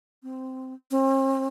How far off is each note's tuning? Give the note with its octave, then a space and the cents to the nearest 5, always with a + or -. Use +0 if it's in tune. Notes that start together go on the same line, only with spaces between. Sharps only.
C4 -10
C4 +45